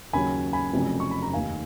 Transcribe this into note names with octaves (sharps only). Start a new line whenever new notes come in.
D#2 C#3 F#3 C#4 G#5 B5
G#5 B5
F1 F2 C#3 F#3
C#6
B5
A#5
F1 D#2 D#3 F5 G#5